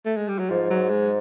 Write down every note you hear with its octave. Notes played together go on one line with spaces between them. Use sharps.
A3
G#3
G3
F#3
G#2 F3
F#3
G#3